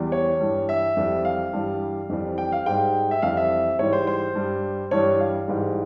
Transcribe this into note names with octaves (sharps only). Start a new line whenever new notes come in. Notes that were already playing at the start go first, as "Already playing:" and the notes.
Already playing: E2 E3 G3
C#5
G2 E3 G3
E5
F2 E3 G3
F5
G2 E3 G3
F2 E3 G3
G5
F5
G#2 G3 G5
E5
F2 E3 G3 F5
E5
G#2 E3 G3 C#5
C5
C5
G2 G3
G2 E3 G3 C#5
F5
G#2 E3 G3